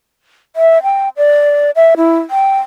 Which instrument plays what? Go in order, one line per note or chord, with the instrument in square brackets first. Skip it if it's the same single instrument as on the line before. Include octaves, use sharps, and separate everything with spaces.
[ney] E5
G5
D5
E5
E4
G5